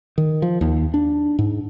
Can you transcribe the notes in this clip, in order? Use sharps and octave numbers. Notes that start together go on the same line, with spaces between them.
D#3
F3
D#2
D4
G#2